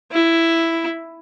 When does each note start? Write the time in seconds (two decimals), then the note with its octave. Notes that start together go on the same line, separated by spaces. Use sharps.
0.12 E4